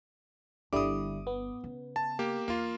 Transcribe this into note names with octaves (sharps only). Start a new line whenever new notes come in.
G1 D3 G3 E4 D6 D#6
B3
C#3
A5
A#3 G4
E2 A#3 F4